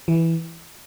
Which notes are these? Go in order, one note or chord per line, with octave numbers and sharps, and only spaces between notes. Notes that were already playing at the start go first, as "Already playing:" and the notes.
E3